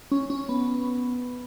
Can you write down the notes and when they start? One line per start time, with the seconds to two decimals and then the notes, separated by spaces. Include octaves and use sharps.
0.12 C#4
0.30 C#4
0.49 B3